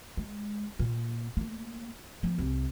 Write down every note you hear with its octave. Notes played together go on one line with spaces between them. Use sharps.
G#3
A#2 A#3
A3 A#3
F3 B3
C2